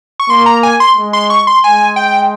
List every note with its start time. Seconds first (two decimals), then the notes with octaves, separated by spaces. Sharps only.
0.20 C#6
0.30 A#3 C6
0.46 A#5
0.63 G#5
0.80 C6
0.97 G#3
1.13 C6
1.30 C#6
1.47 C6
1.63 G#3 G#5
1.96 G5